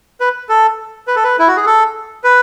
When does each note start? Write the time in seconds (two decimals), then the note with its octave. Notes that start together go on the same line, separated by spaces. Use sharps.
0.20 B4
0.49 A4
1.07 B4
1.16 A4
1.24 B4
1.39 E4
1.48 F#4
1.56 G#4
1.66 A4
2.24 B4